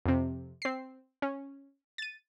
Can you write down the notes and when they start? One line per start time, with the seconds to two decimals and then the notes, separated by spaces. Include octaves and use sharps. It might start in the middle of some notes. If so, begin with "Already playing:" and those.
0.06 F2 C3
0.62 C4 C7
1.22 C#4
1.98 A6 D#7